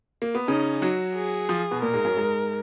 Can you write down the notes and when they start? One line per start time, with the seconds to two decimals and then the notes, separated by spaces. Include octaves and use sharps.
0.22 A#3
0.35 B3
0.48 C#3 C#4 D#4
0.82 F#3 F#4
1.15 G#4
1.49 F3 F4
1.71 B2 B3
1.82 A#2 A#3 A#4
1.93 G#2 G#3
2.05 F#2 F#3
2.16 G#2 G#3